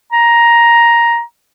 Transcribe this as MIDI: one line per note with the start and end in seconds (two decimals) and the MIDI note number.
0.12 1.22 82